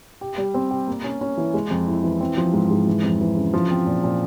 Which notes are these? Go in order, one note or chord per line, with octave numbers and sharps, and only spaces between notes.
G4
G3
C4
G4
A#3
C#4
C#4
E3
G#3
F2
E4
E3
C4
F3
G#2
G#2
E3
F2
E3
C#3
F3
C4
A#2
A#2